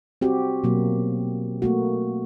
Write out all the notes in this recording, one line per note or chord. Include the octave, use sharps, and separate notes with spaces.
C4 F#4 G4
B2 F#3 A#3
A3 A#3 F#4